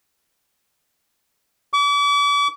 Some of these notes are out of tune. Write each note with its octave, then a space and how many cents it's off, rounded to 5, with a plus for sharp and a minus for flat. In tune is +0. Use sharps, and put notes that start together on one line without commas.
D6 -40